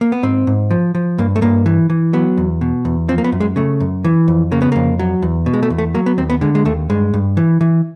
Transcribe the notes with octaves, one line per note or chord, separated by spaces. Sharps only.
A#3
B3
G#2 C4
G#2
F3
F3
G2 A#3
A3
G2 A#3
E3
E3
F#3 B3
E2
B2
E2
F3 C4
A#3
B3
F#2
G#3
C#3 A3
F#2
E3
F2
C#3 A#3
B3
F2 A#3
F#3
E2
B2
G#3
A3
E2
A3
F#3 A#3
B3
D#2 C4
B3
D3 G#3
G#3
D#2 A3
G2 G#3
G2
E3
E3